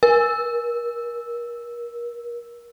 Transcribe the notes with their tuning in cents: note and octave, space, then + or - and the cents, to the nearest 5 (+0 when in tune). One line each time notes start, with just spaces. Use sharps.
A#4 +30